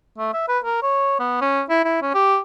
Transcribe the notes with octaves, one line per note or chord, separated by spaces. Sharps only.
A3
E5
B4
A#4
C#5
B3
C#4
E4
E4
C#4
G4